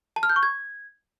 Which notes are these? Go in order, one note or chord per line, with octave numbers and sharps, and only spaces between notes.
A5
F6
G6
C#6
G#6